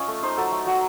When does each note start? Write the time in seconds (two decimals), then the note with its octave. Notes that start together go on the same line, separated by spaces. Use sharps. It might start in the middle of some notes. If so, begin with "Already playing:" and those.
Already playing: C#4 F4 D#5 F5
0.08 A3
0.23 D#4 C5
0.37 F#3 A4
0.52 A3
0.67 F#3